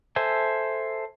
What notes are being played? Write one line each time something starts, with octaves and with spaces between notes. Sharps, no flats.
A4 C5 E5 G#5